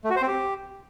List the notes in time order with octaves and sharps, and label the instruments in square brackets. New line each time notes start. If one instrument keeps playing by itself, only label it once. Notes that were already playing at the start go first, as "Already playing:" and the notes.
[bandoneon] A3
F#4
C5
C4
G4